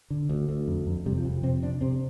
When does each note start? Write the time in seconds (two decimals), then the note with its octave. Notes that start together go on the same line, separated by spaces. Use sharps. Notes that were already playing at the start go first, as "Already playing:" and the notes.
0.10 D3
0.29 D2
0.49 D2
0.68 F2
0.87 F2
1.06 C3 G3
1.18 F3
1.25 F2
1.43 C3 C4
1.62 C3 D4
1.81 C3 C4